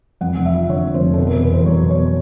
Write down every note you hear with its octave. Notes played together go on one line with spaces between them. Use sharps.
F2 F#5
F1
E5
F3
D3 C#5
F2
C5
F1
B2 A4
A#4
E2
B4
E2 C5
F#3 C#5
B2
C#5